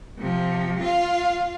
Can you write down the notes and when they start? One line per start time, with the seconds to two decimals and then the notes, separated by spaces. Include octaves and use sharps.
0.19 C3 F3
0.80 F4 F5